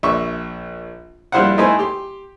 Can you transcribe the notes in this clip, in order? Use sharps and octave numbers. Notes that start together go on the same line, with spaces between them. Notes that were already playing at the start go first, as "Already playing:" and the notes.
A#1 E5 C#6
A#1 G3 E4 C5 F5 F#5
A3 D#4 E4 B4 C5 G#5
G4 C6